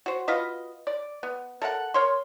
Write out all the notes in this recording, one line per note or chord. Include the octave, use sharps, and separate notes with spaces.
F#4 C5
F4 F#4 B4 D#5
D5
B3
A4 A#4 F5 F#5
A#4 C#5 C6